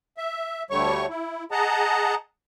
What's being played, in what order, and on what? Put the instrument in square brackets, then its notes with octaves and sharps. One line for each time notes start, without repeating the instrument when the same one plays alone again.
[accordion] E5
D2 D3 G3 A3 C#5 C#6
E4
G#4 D#5 F#5 A5 A#5